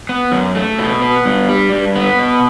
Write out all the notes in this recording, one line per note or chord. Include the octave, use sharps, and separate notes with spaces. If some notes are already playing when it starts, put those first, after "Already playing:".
B3
F#2
A3
B2
B3
G2
G3
G2
B3
B2